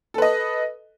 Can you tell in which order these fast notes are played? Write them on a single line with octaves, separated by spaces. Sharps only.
A4 B4 D#5